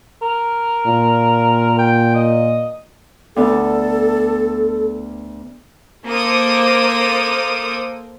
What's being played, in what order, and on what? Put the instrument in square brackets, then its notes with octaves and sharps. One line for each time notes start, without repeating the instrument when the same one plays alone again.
[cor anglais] A#4
[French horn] A#2
[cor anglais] G5
D#5
[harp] D2 B3 [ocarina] A4
[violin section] A#3 A4 C5 D6 D#6